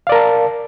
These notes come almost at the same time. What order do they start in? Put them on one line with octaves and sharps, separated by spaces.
F5 D5 A#4 A5